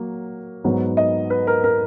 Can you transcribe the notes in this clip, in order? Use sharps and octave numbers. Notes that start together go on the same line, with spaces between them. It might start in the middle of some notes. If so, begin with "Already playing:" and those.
Already playing: F#3 A#3
G#2 F#3 B3 D#4
D#5
B4
A#4
A#4